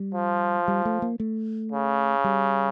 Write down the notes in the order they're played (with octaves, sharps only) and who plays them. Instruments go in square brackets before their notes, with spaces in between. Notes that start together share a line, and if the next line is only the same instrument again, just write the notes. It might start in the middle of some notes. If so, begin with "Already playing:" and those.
Already playing: [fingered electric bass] G3
[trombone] F3
[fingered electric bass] G3
A3
A#3
A3
[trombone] C#3
[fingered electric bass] G3